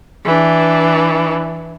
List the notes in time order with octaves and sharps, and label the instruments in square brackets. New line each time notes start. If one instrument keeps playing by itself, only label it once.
[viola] E3 D4